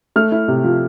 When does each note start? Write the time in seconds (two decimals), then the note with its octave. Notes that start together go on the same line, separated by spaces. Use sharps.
0.16 A3 F6
0.32 E4
0.48 C3
0.64 F3